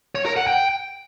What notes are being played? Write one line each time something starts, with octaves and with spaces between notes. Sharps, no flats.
C#5
A#4
F#5
G5